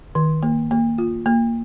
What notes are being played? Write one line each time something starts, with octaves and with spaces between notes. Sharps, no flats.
D#3
A#3
A#3
F4
A#3